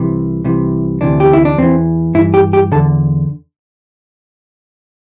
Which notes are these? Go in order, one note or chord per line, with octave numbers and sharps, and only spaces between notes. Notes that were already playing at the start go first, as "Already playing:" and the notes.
Already playing: C2 C3 E3
C2 C3 E3
D2 C3 E3 D4
G4
E4
D4
E2 E3 C4
G2 E3 E4
G4
G4
E2 D3 A4